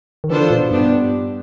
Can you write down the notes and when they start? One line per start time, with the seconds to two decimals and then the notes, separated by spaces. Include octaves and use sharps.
0.24 D#3
0.30 E3 B3 D4 F4 A4 C5
0.50 A#2
0.71 G2 B3 D4 G4